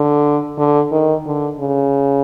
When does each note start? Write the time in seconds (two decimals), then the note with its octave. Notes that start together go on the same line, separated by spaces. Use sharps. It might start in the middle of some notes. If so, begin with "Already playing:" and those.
Already playing: D3
0.58 D3
0.92 D#3
1.26 D3
1.59 C#3